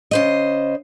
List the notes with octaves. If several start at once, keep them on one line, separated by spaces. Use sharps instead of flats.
C#3 C5 D#5